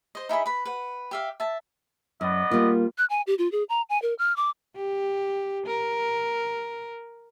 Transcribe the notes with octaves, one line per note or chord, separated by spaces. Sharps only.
C5 D#5
D#4 E4 G#4 B5
B4 B5
B4 F#5
G4 E5 F5
E5 A5
F#2 B3 D5 D#5
G3 A#3 F4
F#6
G#5
G4
F4
G#4
A#5
G#5
A#4
F6
D6
G4
A#4